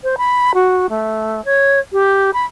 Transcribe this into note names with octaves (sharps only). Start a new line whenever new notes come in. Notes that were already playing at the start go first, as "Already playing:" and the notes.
C5
B5
F#4
A3
C#5
G4
B5